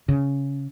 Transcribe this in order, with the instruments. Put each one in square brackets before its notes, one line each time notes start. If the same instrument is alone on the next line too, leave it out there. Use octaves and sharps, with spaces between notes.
[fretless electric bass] C#3